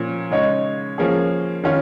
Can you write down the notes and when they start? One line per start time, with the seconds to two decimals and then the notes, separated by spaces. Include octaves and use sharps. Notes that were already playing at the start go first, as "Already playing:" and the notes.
Already playing: A#2 F3 C#4
0.30 C#3 G#3 D#4 C#5
0.98 F3 A#3 C#4 G#4
1.64 D#3 C#4 F4